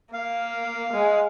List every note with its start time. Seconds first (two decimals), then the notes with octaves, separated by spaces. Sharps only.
0.13 A#3 F5
0.93 G#3